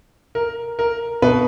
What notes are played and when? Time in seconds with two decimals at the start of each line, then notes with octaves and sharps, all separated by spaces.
0.35 A#4
0.79 A#4
1.22 B2 B4